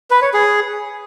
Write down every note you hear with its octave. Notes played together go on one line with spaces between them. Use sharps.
B4
C#5
G#4